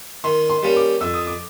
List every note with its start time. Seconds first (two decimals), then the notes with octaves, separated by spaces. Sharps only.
0.24 D#3 C6
0.50 C6
0.63 G3 A#3 C#4
0.76 D6
1.01 F2 E6
1.14 D#6
1.27 D6